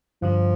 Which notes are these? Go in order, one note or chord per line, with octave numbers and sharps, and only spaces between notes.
G2 D3 F3 G3